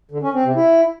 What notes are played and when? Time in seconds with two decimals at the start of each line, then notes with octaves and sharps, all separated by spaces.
0.11 D3
0.22 C#4
0.33 C4
0.45 C3
0.56 E4